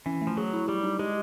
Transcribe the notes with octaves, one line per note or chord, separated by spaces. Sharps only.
E3 C#4
A3
F3
F#3 G#4
E4
G3 G4
D#4
G#3 G4